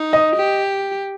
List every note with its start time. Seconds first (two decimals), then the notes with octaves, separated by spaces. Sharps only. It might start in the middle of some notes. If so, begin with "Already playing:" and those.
Already playing: D#4
0.13 D#5
0.36 G4